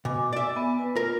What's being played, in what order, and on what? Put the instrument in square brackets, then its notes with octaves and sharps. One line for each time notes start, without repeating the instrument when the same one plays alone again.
[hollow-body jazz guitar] B2 [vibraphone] G#5 D6
[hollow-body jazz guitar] D5 E5
[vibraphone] B3 G#5
B4
[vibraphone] F4 [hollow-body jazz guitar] A#4